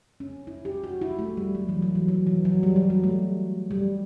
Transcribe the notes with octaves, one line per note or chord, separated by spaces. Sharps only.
C#4
E4
G4
F#4
E4
A3
G3
F#3
E3
F#3
E3
F#3
E3
F#3
G3
F#3
G3
A3
G3